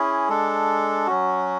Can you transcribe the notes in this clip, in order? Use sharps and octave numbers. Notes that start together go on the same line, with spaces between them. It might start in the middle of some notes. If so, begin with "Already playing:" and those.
Already playing: C#4 E4 G#4
G#3 D4 A4
F#3 C#4 F#4